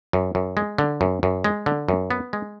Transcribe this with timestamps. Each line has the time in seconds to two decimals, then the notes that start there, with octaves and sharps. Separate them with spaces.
0.13 F#2
0.35 F#2
0.57 G#3
0.78 D3
1.01 F#2
1.23 F#2
1.44 G#3
1.66 D3
1.89 F#2
2.11 B3
2.33 G#3